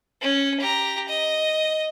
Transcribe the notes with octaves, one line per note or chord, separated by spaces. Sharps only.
C#4
G4 A#5
D#5